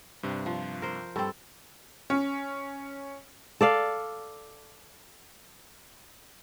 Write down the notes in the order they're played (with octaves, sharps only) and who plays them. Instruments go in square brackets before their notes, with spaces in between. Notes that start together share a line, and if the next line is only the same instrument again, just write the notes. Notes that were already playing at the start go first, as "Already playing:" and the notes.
[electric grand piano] G2 C3
[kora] F3
A#4 C5
[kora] G2 C4 [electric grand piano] A4 E6 A6
[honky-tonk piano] C#4
[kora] A4 D5 F5